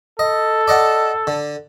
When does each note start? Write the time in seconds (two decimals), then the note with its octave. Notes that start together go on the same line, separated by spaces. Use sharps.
0.19 A4 D#5
0.68 D5 D#5 F#5
1.27 D3